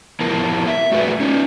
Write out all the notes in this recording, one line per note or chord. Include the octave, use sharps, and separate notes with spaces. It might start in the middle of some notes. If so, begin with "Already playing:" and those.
F3 B3 E4 A#4 A5
E5
A3 F#4 G#4 B4 D5 E5
C#4 D#4